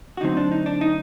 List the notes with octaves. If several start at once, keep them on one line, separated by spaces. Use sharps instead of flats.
F#4
D2 D3 F#3 C4 D#4
D4
D#4
D4
D#4